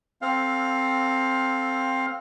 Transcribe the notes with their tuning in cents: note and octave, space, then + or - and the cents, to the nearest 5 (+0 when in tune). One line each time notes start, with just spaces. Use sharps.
C4 +5 A4 +0 F5 +15